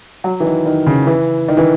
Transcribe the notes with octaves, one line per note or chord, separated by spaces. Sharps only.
F#3
E3
D#3
D#3
C#3
E3
D#3
E3